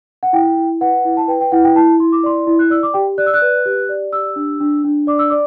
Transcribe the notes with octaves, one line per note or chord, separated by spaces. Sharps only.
F#5
E4 G5
E4
B4 F#5
E4
A5
B4 G5
G5
E4 F#5
G5
E4 A5
E4 C6
D6
D5 C6
E4
F#6
D5 E6
D6
G4 G5
D5 F#6
E6
F#6
B4
G4
D5
G4 E6
D4
D4
D4
D5 D6
E6
D5 D6